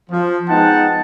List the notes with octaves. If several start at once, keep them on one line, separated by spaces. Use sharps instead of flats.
F3
G#3 B3 D#4 F#5 G5 A5